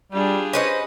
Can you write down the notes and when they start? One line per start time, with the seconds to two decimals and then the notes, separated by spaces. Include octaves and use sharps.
0.12 G3 D4 F4 G4 G#4
0.53 C#4 B4 C5 D#5